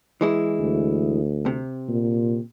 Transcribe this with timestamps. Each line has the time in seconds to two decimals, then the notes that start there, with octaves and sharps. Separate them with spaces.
0.21 E3 G#3 E4
0.59 D2
1.46 C3
1.88 A#2